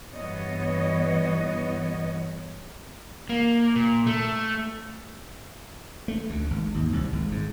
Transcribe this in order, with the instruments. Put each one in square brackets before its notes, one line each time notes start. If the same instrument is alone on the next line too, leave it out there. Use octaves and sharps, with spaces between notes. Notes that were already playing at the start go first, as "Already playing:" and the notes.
[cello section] G2 E3 B3 C#5 D#5
[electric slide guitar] A#3
A#2
A3
[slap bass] A3
D2
G#1
D#2
C2
G#1
G#2